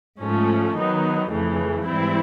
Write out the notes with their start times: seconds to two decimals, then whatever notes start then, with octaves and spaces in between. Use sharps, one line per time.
0.20 G#2 F3 A3 C#4
0.76 D#3 F#3 B3 D#4
1.31 F2 C#3 E3 A3
1.86 G#2 E3 G3 C4 E4